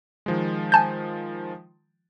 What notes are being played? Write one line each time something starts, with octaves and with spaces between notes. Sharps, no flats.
D#3 F3 G#3
G#5 A5 G6